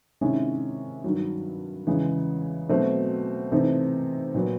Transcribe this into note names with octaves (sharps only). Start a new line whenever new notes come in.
C3 D#3 G#3 C#4 E4
G2 D#3 F#3
E2 C#3 E3 G#3
B2 F#3 A3 C4
C3 E3 A3 C4 D#4
A#2 F#3 B3